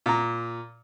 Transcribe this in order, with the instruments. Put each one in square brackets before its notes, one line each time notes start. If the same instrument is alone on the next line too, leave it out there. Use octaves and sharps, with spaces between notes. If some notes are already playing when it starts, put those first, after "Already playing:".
[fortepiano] A#2 A#5